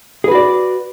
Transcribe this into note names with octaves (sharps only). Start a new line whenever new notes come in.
F#4 G#4 B4 D5